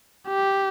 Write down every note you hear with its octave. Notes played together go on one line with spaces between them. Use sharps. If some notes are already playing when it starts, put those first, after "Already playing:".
G4